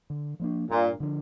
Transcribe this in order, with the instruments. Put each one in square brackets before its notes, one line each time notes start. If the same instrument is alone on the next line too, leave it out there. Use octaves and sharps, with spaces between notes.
[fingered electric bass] D3
F3 A#3 D4
[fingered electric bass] G2 [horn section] A#2
[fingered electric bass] D3 F3 D4